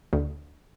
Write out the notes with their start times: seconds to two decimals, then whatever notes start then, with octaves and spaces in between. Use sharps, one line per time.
0.13 D2